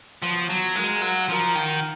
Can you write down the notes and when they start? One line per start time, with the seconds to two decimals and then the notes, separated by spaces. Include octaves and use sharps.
0.22 F3 B3 F#4 C#5
0.50 F#3
0.76 G#3 D#4 F#4 A#4 F5
1.02 F#3
1.29 F3 D#4 F#4 A#4 F5
1.55 D#3